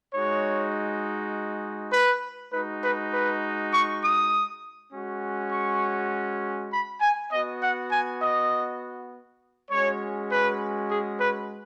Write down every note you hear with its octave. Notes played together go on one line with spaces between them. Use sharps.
G#3 D#4 F#4 C#5
B4
G#3 D#4 F#4 B4
B4
B4
C#6
D#6
G#3 C#4 F#4
C#6
B5
G#5
B3 F#4 D#5
F#5
G#5
D#5
G#3 C#4 F#4 C#5
B4
G#4
B4